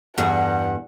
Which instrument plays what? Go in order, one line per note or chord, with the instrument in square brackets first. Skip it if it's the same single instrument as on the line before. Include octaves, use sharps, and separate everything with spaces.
[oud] E2 G2 G#4 [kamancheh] F#5